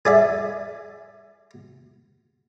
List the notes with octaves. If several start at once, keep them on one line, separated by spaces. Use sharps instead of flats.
G#4 D5 E5